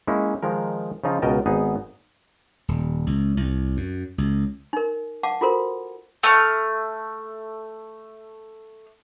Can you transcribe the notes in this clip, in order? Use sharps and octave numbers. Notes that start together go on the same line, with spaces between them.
G#3 A#3 C#4 D#4 E4
D#3 F3 G#3 A#4
C#3 F3 D#4 F4
C#2 B2 A#4 D#5 G5 A5
G#1 B3 D#4 G#4
D#1
C#2
C2
F#2
C#2
D#4 A#4
F5 F#5 A5 D6
F4 F#4 A4 A#4 C5
A3 F6